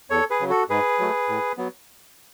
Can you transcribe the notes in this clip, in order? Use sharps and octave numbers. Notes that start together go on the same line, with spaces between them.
E2 A4 C#5
G#4 B4
C#3 F#3
F#4 A4
G#2 G#4 B4
F#3 A3
A2
F#3 B3